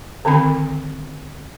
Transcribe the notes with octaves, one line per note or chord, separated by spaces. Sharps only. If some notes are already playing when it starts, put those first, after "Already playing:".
D3 D#3 C4 B5